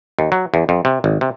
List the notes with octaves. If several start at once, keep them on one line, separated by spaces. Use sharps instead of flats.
D#2
F#3
E2
F2
C3
G#1
C3